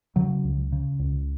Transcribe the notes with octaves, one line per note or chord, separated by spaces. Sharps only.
C#3 F#3
C#2
C#3
C#2